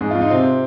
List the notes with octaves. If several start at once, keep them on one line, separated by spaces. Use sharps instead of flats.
G#2 G#4
F4
G#2
D#4
C3 C4